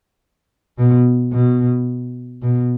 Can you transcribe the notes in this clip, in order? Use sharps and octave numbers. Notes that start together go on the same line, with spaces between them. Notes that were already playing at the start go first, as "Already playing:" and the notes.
B2
B2
B2